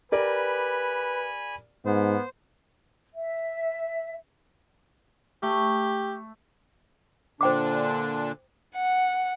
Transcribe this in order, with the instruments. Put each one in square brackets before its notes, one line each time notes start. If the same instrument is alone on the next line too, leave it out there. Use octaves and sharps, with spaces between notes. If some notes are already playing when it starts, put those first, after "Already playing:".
[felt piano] G4 A#4 D5 [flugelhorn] B4 [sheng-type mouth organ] G#5 B5
[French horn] G#2 [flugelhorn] B3 [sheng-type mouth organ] C5
[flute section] E5
[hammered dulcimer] A3 [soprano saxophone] G4
[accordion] A#2 D3 D4 [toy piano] C5 G5 D6
[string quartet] F#5